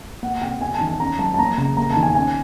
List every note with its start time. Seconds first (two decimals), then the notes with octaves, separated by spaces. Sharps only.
0.22 A#3 F#5
0.42 C3 G5
0.61 C3 G#5
0.75 A5
0.81 D#3
0.87 A5
1.00 C#4 A#5
1.19 F#3 A5
1.34 A5
1.39 A#3 A#5
1.57 C#3 A#5
1.77 A#3 A#5
1.91 A5
1.96 D#3
2.03 G#5
2.15 C#4 G#5